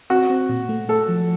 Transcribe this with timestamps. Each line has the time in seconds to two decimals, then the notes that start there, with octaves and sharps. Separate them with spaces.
0.10 C4 F#4
0.30 C4
0.49 A#2
0.69 A3
0.89 A3 A4
1.08 F3